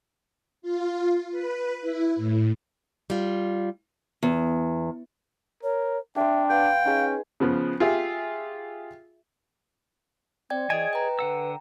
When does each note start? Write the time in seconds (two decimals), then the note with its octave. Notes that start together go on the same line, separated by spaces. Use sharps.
0.62 F4
1.31 B4
1.81 E4
2.16 A2
3.10 G3 F4
4.23 E2
5.63 A#4 C#5
6.16 C4 D4 E5 G5
6.50 B3 F5 G5
6.85 C#4 D#4 G#4
7.40 C#3 F3 B3
7.80 F4 G4 G#4 E5
10.50 C4 D5 G5 G#6
10.70 E3 G#4 C#5 D#5 G#5 D7
10.93 B4 G5 A#5
11.19 D3 F#5 E6